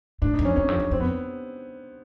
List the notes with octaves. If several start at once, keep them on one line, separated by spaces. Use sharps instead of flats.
A2 D4
D#4
F2
C#4
E2 C#4
F2
F2
F2 C4
B3